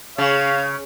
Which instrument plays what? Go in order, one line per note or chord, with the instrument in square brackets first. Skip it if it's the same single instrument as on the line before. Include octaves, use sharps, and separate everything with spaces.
[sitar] C#3 [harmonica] C#5 F5